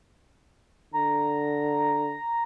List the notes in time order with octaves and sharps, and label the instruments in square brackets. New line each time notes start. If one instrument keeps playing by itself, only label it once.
[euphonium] D3 [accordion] A#5